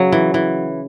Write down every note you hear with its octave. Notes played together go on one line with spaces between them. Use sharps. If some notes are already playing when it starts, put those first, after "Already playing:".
Already playing: C#3 F#3
E3
E3